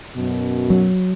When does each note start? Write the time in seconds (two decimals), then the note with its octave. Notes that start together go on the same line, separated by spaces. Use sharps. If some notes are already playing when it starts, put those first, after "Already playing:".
0.17 F#2 B2
0.70 F#3